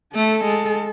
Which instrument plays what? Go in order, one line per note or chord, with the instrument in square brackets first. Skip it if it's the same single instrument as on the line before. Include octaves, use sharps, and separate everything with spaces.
[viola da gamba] A3 [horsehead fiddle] A4
[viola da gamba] G#3